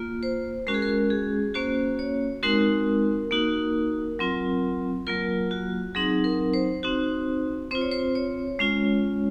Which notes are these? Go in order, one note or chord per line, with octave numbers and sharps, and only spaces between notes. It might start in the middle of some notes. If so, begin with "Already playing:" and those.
Already playing: A#3 F4
C5
G#3 C#4 F#4 A#4
G#4
A#4
G#4
A#3 C#4 F#4 C5
C#5
G#3 C4 D#4 F#4 A#4
A#3 D#4 F#4
F#3 C4 F4
F#3 A#3 F4 A#4
F#4
F#3 C4 D#4 G#4
A#4
C5
C4 D#4 F#4
C4 F4 C5
C#5
C5
C#5
G#3 C#4 F4